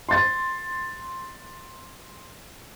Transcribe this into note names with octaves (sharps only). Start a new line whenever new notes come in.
C6 A6